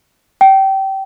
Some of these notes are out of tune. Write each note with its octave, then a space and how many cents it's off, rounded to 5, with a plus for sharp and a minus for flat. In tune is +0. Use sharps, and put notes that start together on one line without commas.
G5 -25